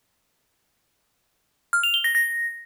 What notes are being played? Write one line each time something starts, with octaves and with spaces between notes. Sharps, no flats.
F6
F7
G7
A#6
A#6